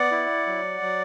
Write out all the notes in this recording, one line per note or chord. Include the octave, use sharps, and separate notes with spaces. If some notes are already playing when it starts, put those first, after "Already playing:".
Already playing: B3 D5 F#5
E4
F#3
F#3